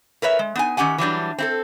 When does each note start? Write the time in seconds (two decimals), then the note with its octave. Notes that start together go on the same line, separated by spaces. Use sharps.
0.22 A#4 B4 C#5 E5
0.39 G#3
0.55 B3 D#4 G#5
0.77 D#3 C#4 G4 F#5 G#5
0.98 E3 F#3 G3 D4
1.38 C4 E4 A4